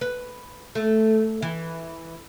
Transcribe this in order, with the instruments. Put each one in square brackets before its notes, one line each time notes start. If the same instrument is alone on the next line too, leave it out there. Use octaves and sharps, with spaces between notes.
[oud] B4
A3
E3